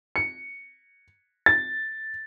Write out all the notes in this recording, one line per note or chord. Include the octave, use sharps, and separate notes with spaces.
C#7
A6